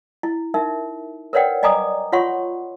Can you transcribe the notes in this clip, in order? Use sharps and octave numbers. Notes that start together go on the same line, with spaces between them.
E4
D#4 A#4 E5
A#4 B4 C#5 D5 F#5 G5
D5 D#5 G#5 A#5 D6 D#6
F4 C#5 F#5 C6 C#6